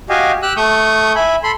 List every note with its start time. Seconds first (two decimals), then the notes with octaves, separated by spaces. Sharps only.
0.09 F#4 G4 D#5 F5 G#5
0.42 G4 E6 F#6
0.57 A3 C#6 D#6 G6
1.15 E5 G#5 B5
1.43 A4 B5 C6